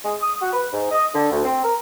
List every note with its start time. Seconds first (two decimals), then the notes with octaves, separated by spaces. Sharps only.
0.03 G#3
0.21 D#6
0.42 F#4
0.53 B4
0.73 G#2
0.91 D#5
1.14 D3
1.32 D2
1.44 C4
1.64 A#4